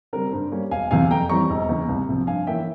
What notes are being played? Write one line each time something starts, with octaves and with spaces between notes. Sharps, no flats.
C#3 G3 C4 A#4
G2 C5
G3 A#3 C#4
E1 F5 G#5
E2 C3 F5 G#5
F2 G5 A#5
E3 G3 C4 A#5 C#6
E1
E2 C#3
C2
C3 F3
G2 F5 G#5
E3 A#3 C#4 E5 G5